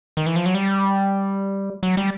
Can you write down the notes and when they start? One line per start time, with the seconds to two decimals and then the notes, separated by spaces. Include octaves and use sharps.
0.17 D#3
0.26 E3
0.36 F3
0.46 F#3
0.55 G3
1.83 F#3
1.97 G3